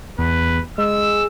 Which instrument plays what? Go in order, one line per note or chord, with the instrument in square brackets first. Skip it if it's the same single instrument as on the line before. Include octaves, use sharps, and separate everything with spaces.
[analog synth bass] E2 [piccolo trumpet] B4
[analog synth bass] G#3 [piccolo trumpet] E6